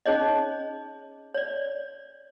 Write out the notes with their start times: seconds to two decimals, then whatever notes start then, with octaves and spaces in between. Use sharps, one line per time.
0.06 C#4 D#4 G#4 C#5 D#5
1.34 C#5 D5